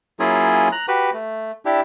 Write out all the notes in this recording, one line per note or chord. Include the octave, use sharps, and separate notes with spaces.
F#3 A#3 C#4 E4 F4 G#4
A#5 F#6
F#4 G4 B4
A3
D4 E4 G4